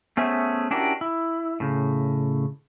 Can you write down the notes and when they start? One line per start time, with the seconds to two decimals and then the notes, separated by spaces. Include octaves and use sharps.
0.17 A3 B3 C#4 G#4 C5 E5
0.71 C#4 D4 E4 F#4 G4 A#4
1.01 E4
1.60 A2 C#3